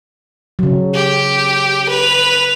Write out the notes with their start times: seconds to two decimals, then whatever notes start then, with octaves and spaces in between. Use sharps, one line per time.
0.59 C#3 F#3
0.95 G4
1.90 B4 F7